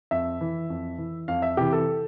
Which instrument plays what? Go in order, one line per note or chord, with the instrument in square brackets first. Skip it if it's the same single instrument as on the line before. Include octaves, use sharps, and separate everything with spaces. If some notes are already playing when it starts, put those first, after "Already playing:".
[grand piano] F2 E5
E3
F2
E3
F2 F5
E5
C3 E3 G4
A4